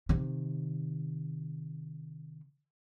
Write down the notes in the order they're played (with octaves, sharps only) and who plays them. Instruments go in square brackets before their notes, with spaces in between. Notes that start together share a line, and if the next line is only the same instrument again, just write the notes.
[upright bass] C3 D#3